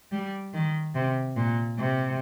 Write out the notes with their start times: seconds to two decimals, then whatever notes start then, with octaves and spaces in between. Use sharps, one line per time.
0.12 G3
0.53 D#3
0.95 C3
1.36 A#2
1.78 C3